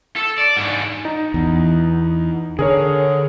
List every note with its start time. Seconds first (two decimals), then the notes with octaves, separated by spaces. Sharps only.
0.16 A4
0.38 D5
0.57 G#2 D4
1.05 D#4
1.34 E2
2.59 D3 G#4 A#4 C#5